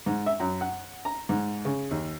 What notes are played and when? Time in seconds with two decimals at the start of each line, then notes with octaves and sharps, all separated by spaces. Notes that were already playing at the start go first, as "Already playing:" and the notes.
0.06 G#2
0.26 E5
0.40 F#2
0.61 F#5
1.05 A#5
1.29 G#2
1.65 C#3
1.91 D#2